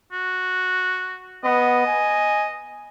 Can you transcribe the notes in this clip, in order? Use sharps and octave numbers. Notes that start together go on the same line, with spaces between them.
F#4
B3 D#5
G#5